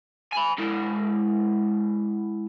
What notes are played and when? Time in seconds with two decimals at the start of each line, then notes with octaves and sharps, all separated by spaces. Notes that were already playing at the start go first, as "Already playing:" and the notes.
0.33 G#5 B5
0.59 G#3 E4